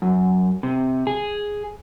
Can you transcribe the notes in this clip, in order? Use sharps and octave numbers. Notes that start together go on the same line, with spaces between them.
F#2
C3
G#4